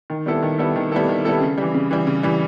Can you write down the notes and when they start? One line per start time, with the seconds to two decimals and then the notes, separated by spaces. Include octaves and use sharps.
0.10 D#3
0.26 G3 B3 E4 A4
0.43 D#3
0.59 G3 B3 E4 A4
0.76 D#3
0.92 G3 B3 E4 A4
1.09 D#3
1.25 G3 B3 E4 A4
1.41 C#3
1.58 E3 G3
1.74 C#3
1.91 E3 G3
2.07 C#3
2.23 E3 G3